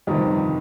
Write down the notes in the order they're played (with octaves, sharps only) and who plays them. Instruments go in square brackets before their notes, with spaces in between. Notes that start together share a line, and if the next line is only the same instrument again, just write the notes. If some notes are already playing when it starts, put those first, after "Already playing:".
[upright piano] G1 F2 C3 D#3 G3